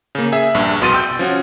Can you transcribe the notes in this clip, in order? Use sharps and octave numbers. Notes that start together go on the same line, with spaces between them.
C#3 A#3
G#4 E5
A#1 G2
C2 B2 C6 A6 D#7
G5 E6 G6
F3 C#4 F#4